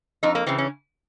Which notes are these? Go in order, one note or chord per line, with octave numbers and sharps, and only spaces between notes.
F2 D#4
A#3
C#3 E3 C4
C#4